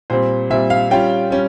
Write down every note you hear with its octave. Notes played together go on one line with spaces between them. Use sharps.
A#2 G3 C4 C5
A#2 G3 C4 E5
F5
G3 C#4 F4 G5
G3 C#4